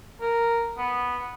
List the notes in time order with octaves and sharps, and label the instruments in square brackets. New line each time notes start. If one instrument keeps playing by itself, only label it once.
[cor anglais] A#4
B3